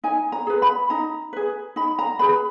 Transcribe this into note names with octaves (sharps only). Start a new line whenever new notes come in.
D#4 G#5
A#5
G#4 B4
B5
D#4 A#5
G#4 B4
D#4 B5
A#5
G#4 B4 B5